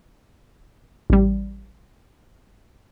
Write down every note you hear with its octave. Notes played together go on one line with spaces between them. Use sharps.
A1 G3